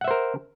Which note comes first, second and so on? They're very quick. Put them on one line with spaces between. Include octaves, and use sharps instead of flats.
F#5 E5 C5 A#4